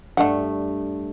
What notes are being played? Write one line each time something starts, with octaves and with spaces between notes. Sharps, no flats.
G2 A3 D4 F#5